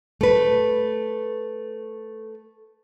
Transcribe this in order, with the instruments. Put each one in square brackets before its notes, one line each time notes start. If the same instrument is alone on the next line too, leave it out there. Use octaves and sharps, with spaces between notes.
[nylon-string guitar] A3 B4